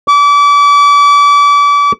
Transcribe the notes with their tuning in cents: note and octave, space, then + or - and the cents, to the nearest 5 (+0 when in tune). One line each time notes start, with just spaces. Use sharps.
D6 -35